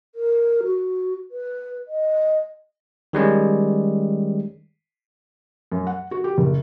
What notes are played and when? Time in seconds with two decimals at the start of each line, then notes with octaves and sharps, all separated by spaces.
0.15 A#4
0.64 F#4
1.31 B4
1.88 D#5
3.13 D#3 G3 G#3 C#4
5.72 F#2
5.87 F#5
6.11 F#4
6.24 G4
6.38 F#1